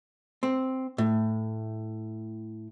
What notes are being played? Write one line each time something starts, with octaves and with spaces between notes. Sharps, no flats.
C4
A2